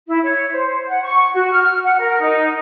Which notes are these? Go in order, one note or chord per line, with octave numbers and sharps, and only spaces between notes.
E4
C#5
C5
F#5
C#6
F#4
F6
F#5
A#4
D#4